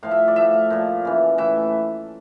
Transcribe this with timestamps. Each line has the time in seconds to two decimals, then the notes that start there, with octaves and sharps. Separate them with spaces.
0.03 A2 F3 F5
0.11 E5
0.28 D5
0.36 A2 F3 E5
0.53 F5
0.70 A#2 F3
1.05 C#3 E3
1.38 A2 E3 E5